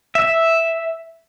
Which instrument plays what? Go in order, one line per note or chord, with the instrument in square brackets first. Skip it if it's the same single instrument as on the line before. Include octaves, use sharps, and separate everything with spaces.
[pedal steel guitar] E5